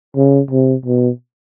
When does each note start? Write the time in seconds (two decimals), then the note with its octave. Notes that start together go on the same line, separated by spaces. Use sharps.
0.17 C#3
0.51 C3
0.86 B2